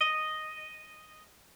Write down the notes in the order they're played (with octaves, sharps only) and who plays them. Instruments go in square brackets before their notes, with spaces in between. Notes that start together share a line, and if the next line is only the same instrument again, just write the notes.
[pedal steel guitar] D#5